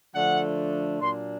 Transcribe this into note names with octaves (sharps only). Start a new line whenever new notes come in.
D3 F3 A3 D4 F#5
A#2 F#3 A#3 D4 C6